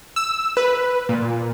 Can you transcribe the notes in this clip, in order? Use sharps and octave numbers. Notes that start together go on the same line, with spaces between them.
E6
B4
A#2